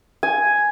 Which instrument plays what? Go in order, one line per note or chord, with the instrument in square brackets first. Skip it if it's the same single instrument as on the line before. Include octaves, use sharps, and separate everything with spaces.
[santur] G#5